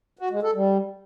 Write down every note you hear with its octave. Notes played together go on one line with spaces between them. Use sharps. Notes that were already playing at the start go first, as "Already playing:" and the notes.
F#4
G#3
A4
G3